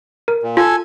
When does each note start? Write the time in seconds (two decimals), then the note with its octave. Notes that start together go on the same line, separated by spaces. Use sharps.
0.28 A#4
0.43 A#2
0.57 F4 A4 G#5